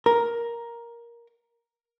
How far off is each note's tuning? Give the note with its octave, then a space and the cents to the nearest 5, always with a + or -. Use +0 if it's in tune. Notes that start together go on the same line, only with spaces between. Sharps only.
A#4 +10